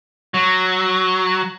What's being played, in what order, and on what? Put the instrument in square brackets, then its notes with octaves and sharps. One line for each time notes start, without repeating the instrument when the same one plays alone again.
[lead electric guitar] F#3